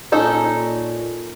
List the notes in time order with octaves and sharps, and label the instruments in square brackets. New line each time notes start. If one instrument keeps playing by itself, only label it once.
[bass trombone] A#2 [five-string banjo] C#4 D#4 A4